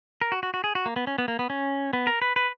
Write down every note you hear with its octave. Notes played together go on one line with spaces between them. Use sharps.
A#4
F#4
F#4
F#4
G#4
F#4
A#3
B3
C#4
B3
A#3
B3
C#4
B3
A#4
B4
B4